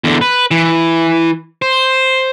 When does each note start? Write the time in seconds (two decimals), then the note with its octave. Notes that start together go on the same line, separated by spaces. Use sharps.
0.04 E2 D3
0.21 B4
0.51 E3
1.62 C5